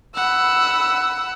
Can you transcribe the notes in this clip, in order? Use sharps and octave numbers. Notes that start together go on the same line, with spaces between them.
F#5 B5 E6